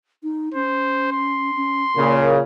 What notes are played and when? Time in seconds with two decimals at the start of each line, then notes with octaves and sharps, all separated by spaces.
0.23 D#4
0.54 C#4 C5
1.12 C6
1.56 C#4
1.96 A#2 C#3 A#4